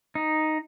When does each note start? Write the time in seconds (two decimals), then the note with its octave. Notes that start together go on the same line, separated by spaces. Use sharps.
0.15 D#4